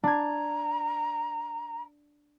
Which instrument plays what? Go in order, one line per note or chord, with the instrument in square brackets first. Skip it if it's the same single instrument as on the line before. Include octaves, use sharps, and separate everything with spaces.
[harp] D4 G#6 [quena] A#5